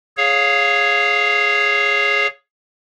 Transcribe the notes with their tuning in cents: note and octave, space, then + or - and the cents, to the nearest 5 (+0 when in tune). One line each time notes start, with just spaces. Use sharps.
G#4 +0 C#5 +0 F5 +15